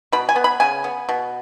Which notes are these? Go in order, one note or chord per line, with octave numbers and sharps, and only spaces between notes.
B2 B5
G#5
B3
B5
C#3 G#5
B3
B2